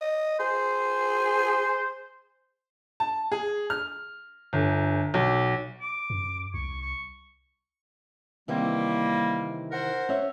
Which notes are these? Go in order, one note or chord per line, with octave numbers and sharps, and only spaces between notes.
D#5
G#4 C5
A5
G#4
F6
G1
B1
D6
F#2
C2 C#6
C#6
C3 D#3 E3 G3 A#3
A#4 C5 F#5
C#4 C#5 E5